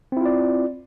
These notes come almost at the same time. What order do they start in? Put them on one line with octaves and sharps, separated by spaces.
C4 E4 F4 D5